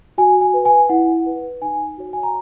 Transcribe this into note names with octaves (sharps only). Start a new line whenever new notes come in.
F#4 G#5
G#5
B4
G#5
E4 F#5
B4
D#4 G#5
F#4 C#5
G#5
A#5